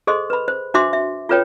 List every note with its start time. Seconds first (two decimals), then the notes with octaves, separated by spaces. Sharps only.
0.07 G#4 A4 C5 D#5 C6
0.30 B4 B5
0.48 C5
0.74 D4 F#4 C5 E5 C6 D6
0.93 E5
1.29 F4 A4 B4 C#5 G5